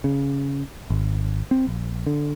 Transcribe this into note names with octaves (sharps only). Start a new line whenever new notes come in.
C#3
G#1
C4
A#1
D3